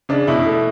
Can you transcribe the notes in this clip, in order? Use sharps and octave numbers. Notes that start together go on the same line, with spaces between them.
C#3 D4
B2 E4
A3